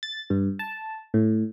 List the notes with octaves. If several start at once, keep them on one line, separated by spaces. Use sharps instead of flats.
A6
G2
A5
A2